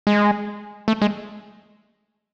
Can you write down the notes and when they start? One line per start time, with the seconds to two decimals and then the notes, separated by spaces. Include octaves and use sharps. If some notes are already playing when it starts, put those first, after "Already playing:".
0.07 G#3
0.88 A3
1.02 G#3